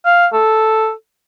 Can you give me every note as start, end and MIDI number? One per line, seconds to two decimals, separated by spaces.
0.05 0.27 77
0.33 0.92 69